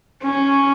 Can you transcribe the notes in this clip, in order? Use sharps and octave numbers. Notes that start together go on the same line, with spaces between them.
C#4